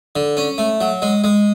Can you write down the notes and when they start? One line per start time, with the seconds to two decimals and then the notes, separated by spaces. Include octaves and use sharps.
0.16 D3
0.37 C#4
0.58 A3
0.81 F#3
1.02 G#3
1.24 G#3